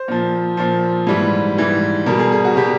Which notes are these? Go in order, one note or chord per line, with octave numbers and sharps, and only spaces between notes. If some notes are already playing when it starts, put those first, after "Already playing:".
Already playing: C5
A#2 F3
A#2 F3
G#2 E3 G3 B4
G#2 E3 G3
B2 G3 A#4
G#4
G#4
F#4
B2 G3 G4